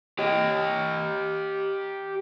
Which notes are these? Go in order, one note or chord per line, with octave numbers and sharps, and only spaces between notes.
G4 D#5